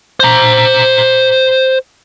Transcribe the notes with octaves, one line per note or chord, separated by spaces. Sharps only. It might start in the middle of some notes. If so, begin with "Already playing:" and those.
C5 A#5